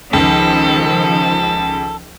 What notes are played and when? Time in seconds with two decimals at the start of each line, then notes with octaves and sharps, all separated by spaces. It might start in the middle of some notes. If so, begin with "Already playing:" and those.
0.13 C#2 D#3 F3 A4